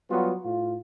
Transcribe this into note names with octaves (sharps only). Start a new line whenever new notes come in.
F#3 G3 B3 F4 F#4
A2 F4